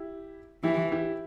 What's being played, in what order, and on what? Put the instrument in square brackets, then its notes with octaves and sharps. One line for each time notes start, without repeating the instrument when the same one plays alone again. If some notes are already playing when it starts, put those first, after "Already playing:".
Already playing: [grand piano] E4 G4
[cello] E3 [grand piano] E4 G4
[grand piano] E4 G4